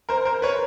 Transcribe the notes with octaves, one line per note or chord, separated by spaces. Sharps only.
A#4 C5
A#4 C5
B4 C#5